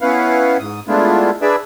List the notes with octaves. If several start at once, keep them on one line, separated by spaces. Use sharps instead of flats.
B3 C#4 E4 B4 F5 F#5
G#2 D#6
G#3 A3 B3 D4 E4 F4
D4 G#4 B4 D5 E5